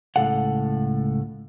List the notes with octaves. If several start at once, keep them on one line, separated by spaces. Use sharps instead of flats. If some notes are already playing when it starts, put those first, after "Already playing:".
C#2 A2 D#3 A4 F5 F#5